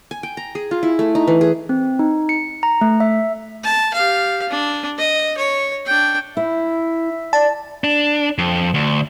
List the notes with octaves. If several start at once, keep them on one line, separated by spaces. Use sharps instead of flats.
G#5
G5
A#5
G#4
F4
E4
A3
D#4
E3
G#4
C4
D#4
C#7
A#5
A3
E5
A5
G4 F5
D4
D#5
C#5
D4 G5
E4 E5
D5 A5
D4
F2
D2